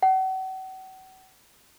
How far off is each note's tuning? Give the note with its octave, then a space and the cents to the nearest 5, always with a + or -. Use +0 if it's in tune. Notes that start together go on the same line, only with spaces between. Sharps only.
F#5 +40